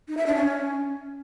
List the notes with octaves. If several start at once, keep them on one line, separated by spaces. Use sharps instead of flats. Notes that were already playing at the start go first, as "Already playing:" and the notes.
D#4
E5
D4
C#4